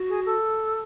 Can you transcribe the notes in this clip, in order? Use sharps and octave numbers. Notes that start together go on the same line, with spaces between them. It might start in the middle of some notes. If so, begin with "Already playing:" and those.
Already playing: F#4
G#4
A4